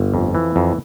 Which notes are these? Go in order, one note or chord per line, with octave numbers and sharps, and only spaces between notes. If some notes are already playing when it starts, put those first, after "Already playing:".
Already playing: G1
F2
E3
F2